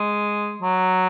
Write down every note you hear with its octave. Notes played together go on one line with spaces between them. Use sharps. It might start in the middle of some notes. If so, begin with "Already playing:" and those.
Already playing: G#3
F#3